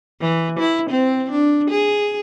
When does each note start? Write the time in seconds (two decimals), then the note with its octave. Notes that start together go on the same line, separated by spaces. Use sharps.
0.21 E3
0.60 E4
0.91 C4
1.31 D4
1.71 G#4